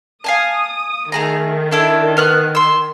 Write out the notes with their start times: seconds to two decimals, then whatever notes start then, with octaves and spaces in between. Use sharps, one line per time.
0.24 F5 G#5 A5 D#6
1.12 D#3 A3 G#4 A#5
1.71 D4 E4 A4
2.17 B3 F6 F#6
2.55 C6 E6